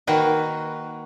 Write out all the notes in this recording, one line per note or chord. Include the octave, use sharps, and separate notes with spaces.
D#3 A#3 F#4 B4